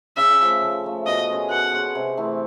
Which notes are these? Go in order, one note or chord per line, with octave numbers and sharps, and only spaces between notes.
C#3 E5
F3 A3
C#3
F3 A3
B2 D#5
G#3 C#4
B2 F#5
G#3 C#4
C3
E3 A3 C4